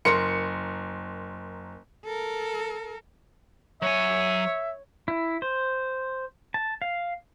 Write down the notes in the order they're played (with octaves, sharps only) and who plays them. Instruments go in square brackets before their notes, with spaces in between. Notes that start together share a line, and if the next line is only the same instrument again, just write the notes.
[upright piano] F#1 A#4 C6 C#7
[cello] A4 A#4
[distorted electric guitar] F#3 G#5 [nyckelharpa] C#5 [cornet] E5
[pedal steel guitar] E4
C5
A5
F5